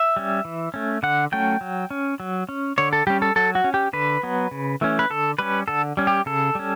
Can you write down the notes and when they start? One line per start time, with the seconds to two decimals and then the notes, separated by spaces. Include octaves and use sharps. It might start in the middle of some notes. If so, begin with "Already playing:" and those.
Already playing: E5
0.17 G3 C#4
0.45 E3
0.74 A3 C#4
1.03 D3 F#5
1.32 F#3 A3 C#4 G5
1.61 F#3
1.91 C#4
2.20 F#3
2.49 C#4
2.78 D3 C#5
2.93 A4
3.07 G3 C#4 G4
3.22 A4
3.36 F#3 A4
3.55 F#4
3.64 C#4
3.74 G4
3.93 D3 B4
4.23 F#3 B3
4.51 C#3
4.81 E3 A3 C#4
4.99 B4
5.10 D3 A4
5.39 G3 C#4 B4
5.68 D3 A4
5.97 G3 C#4
6.07 G4
6.26 C#3 A4
6.55 G3 C#4